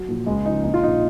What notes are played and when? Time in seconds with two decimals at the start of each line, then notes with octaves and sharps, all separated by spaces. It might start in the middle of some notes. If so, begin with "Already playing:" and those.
Already playing: F#3
0.08 A#2 F3
0.26 C#2 G#3
0.45 C#3 F3 D#4
0.64 A#1 D#4
0.74 F4
0.82 A#2 F3 D#4